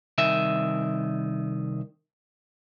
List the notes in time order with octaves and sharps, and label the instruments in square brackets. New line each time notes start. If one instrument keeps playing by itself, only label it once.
[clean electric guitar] C2 D#3 E5